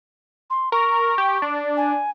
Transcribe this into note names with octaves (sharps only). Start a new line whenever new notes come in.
C6
A#4 C#6
G4
D4
G#5